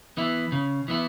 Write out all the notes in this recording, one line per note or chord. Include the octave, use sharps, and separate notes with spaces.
E3 B3 E4
C#3
E3 B3 E4